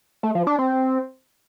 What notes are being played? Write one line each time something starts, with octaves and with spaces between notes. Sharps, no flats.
A3
F3
D4
C4